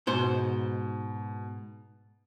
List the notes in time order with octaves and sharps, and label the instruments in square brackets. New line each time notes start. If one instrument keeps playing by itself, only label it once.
[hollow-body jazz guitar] G#2 C5 [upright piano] B2